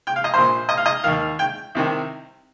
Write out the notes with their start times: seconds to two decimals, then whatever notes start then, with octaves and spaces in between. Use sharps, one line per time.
0.07 G5
0.16 F5
0.24 D#5
0.33 A#1 A#2 C5
0.69 D#5
0.77 F5
0.86 D#5
1.04 D#2 D#3 F5
1.39 G5
1.75 C2 C3 D#3